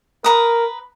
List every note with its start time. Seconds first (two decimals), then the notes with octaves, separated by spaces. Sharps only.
0.24 A#4 B4 A#5 D#6